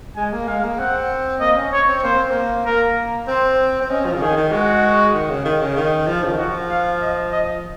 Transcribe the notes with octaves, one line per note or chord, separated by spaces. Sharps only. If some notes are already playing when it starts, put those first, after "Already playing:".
G#3 G#5
A#3
G#3 F5
A#3
C4 F#5
A#3 D#5
C#4
C#5
C4
A#3 C5
C4
A#3
A#3 A#4
C4 C5
C4
C#4 D#5
F3
C#3
D#3 G#4
D#3
G#3 F#4
D#3
C#3
D#3
C#3
D#3
F3
C#3
D#3
F3 F#4
F5
D#5
D#5